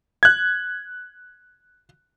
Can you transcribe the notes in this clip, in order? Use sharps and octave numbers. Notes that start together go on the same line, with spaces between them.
F#6 G#6